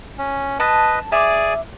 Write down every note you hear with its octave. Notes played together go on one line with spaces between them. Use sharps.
C#4
B4 D#5 A5
G#4 D5 E5 G#5 D6